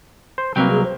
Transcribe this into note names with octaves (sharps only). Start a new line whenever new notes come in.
C5
C2 F#3 A#3 C4 B4 G5
G#4
C5